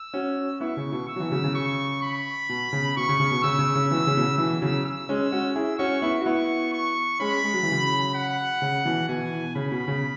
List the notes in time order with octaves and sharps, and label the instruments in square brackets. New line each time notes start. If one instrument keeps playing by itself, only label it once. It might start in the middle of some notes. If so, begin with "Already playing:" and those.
Already playing: [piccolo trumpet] E6
[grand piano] C#4 F#4
[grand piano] B3 E4 [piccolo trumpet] C#6
[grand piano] C#3
B2
[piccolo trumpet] E6
[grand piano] F#3
B2 E3
C#3 F#3
C#3
[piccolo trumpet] C#6
B5
[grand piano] B2
C#3
[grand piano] B2 [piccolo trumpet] C#6
[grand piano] C#3
C#3
B2
[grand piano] C#3 [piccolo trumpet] E6
[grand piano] C#3
C#3
B2 E3
C#3
B2
C#3
[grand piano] B2 E3 [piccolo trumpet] E6
[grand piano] C#3 F#3
[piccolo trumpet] E6
[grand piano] G#3 C#4
C#4 F#4
E4 G#4
[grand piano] C#4 F#4 [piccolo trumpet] C#6
[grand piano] B3 E4
F#4
[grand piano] B3 E4 [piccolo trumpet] C#6
[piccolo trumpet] C#6
[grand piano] G#3 C#4 [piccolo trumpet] B5
[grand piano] G#3
F#3
E3
C#3 F#3
[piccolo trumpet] F#5
[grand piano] C#3
B2 E3
[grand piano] B2 E3 [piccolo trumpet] G#5
[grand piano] C#3 [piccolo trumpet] B5
[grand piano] B2
C#3